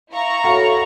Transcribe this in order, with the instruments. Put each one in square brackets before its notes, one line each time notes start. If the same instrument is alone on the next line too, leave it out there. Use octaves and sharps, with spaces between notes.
[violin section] E4 A#5 C#6 [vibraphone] F5
[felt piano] F#4 F5 [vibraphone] A4 C#5